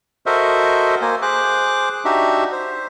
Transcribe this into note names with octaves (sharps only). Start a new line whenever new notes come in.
F#4 A4 A#4 C5 D#5 E5
A#3 C5 G#5
G#4 C5 D6 F#6
D4 D#4 F#4 G4 E5
C5